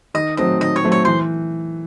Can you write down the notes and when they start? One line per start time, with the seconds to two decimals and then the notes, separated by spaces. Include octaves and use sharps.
0.14 D#3 D#5
0.37 F#3 A3 C4 D#5
0.60 D#3 D#5
0.76 C#5
0.84 F#3 A3 C4
0.92 C#5
1.05 E3 C5